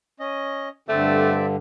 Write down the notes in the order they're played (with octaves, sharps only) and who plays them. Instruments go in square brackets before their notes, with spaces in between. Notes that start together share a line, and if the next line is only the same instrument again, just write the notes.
[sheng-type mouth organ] C#4 D#5
[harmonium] G2 D3 [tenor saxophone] A3 [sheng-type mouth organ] C4 D5 E5